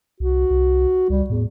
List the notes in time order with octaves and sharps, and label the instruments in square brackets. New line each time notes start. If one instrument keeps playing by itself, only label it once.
[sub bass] C2 [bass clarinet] F#4
[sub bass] C2
[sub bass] C#2 [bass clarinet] G3
[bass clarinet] E2 [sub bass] A2